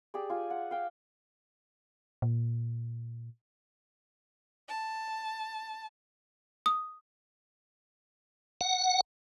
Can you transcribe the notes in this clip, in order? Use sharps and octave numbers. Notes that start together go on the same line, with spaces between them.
G4 G#4 D5
F4 G#5
F#5
F5 G5
A#2
A5
D#6
F#5